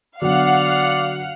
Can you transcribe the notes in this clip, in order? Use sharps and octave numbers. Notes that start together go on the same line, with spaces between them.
D3 F#3 B3 D5 F5 F#5 F6